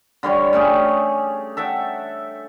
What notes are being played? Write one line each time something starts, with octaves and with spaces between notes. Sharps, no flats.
D3 G3 C#5 C#6
A3 C#4 G4 G#4
A4 E5 F#5 G5